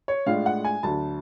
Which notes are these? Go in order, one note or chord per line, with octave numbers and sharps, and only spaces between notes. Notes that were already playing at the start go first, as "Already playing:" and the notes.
C#5
A2 G#3 D4 F4 F5
F#5
G#5
D2 D3 F#3 A5